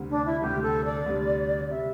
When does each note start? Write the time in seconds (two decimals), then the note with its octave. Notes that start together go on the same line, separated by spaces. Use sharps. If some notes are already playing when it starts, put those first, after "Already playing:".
Already playing: D2 C3 G3
0.10 D4
0.26 E4
0.41 D2 C3 G3 G4
0.62 A4
0.85 D5
1.06 D2 C3 G3
1.70 C3 G3 E5